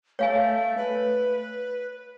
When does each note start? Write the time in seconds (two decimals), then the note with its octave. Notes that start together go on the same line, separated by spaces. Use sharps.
0.19 A3 C#5 F5 G#5
0.78 B4